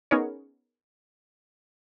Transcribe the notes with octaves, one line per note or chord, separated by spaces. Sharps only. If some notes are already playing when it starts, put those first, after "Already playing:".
B3 C#4 D#4 G#4 A#4 C#5